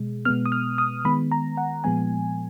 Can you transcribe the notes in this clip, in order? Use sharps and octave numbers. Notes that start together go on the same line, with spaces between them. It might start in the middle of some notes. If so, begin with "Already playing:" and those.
Already playing: B2 G#3
B2 G#3 B3 F6
D#6
F6
D#6
D#3 G#3 B3 B5
A#5
F#5
A#2 F3 G#3 B3 G#5